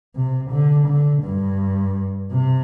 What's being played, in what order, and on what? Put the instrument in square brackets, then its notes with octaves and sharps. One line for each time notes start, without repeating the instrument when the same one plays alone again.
[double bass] C3
D3
D3
G2
C3